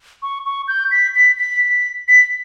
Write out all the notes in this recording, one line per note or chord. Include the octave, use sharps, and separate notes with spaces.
C#6
C#6
G6
B6
B6
B6
B6